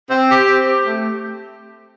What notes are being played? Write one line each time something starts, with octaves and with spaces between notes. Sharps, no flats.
C4
G4
C4
G4
A3